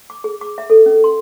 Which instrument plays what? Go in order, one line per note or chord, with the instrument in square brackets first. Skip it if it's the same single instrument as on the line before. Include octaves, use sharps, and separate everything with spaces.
[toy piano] D6
G#4
D6
E5
A4
C#4
C6